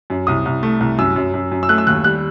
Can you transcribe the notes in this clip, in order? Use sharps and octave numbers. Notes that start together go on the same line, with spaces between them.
F#2
C2 D#6
C2
A3
C2
F#2 E6
F#2
F#2
F#2
E6
A3 F#6
E6
D#2 F#6
G3 F#6